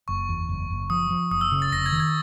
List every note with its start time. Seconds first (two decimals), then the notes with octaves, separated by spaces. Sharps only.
0.08 F#1 C#6
0.29 E2
0.49 F#1
0.70 F#1
0.90 F3 D#6
1.11 F3
1.31 F#1 D#6
1.41 E6
1.52 C#3
1.62 A6
1.72 F1 A#6
1.86 G#6
1.92 D#3
2.00 G#6